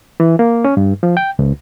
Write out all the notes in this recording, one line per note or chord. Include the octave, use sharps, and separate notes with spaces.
E3
A#3
C#4
G2
F3
G5
C#2